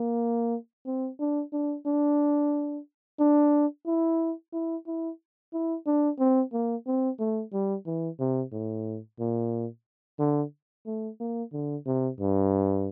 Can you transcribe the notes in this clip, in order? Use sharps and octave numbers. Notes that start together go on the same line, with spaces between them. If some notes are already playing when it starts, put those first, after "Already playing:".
Already playing: A#3
C4
D4
D4
D4
D4
E4
E4
E4
E4
D4
C4
A#3
C4
A3
G3
E3
C3
A2
A#2
D3
A3
A#3
D3
C3
G2